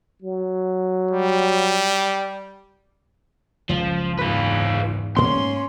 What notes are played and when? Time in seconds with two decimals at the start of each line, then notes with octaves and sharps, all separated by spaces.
0.22 F#3
1.11 G3
3.69 F#1 C#2 F3
4.19 E2 G#2 F4 B4
5.17 G#2 A#3 B3 C#4 C6